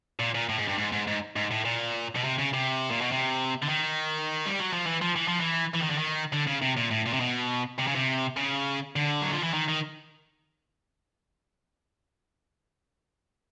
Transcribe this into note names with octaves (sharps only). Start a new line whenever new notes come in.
A#2
A#2
A2
G#2
G2
G#2
G#2
G#2
G#2
A2
A#2
B2
C3
C#3
C3
A#2
B2
C3
D3
D#3
G3
F#3
F3
E3
F3
E3
F3
E3
E3
D#3
D3
D#3
D3
C#3
C3
A#2
A2
A#2
C3
B2
C3
C#3
C3
C#3
D3
F#3
F3
E3
D#3
D#3